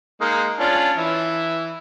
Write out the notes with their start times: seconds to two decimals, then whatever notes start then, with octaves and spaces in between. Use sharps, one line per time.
0.21 G#3 A#3 D#4
0.60 C#4 D4 F4
0.98 E3 E5